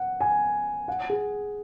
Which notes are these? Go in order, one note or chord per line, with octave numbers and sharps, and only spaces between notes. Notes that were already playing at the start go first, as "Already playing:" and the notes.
Already playing: F#5
G#5
F#5
G#4